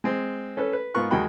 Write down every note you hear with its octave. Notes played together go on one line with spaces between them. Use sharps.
G#3 C4
C#4 A4 B4
B4
G#2 B3 F4 A#4 C#6 F#6
D#2 G#3 F#4 G5 B5 F#6